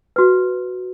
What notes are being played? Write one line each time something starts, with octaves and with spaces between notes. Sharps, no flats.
F#4 B4